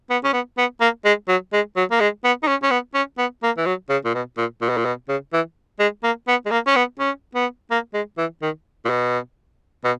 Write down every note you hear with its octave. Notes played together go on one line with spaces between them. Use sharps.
B3
C#4
B3
B3
A#3
G#3
F#3
G#3
F#3
A#3
G#3
B3
D#4
C#4
C#4
B3
C#4
B3
A#3
E3
F#3
C#3
A#2
B2
A#2
A#2
B2
A#2
B2
C#3
E3
G#3
A#3
B3
G#3
A#3
C#4
B3
C#4
B3
A#3
G#3
E3
D#3
A#2
B2
B2